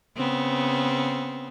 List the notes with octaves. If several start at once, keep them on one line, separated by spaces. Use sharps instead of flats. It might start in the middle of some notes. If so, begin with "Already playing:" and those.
C#3 B3 C4